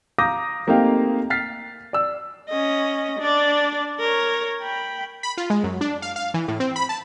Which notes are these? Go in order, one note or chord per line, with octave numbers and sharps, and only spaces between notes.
F5 A#5 D6 D#6 G6 A#6
A3 A#3 C4 D#4 G4 F5
F6 A6 B6 C7
D5 E6
C#4 D#5
D4 D5
A#4 C#5
G5 B5
B5
F4
G#3
F#2
D4
F5
F5
E3
A2
C4
B5
A5